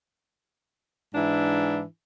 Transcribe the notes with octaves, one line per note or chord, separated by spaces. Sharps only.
G#2 E3 D4 E4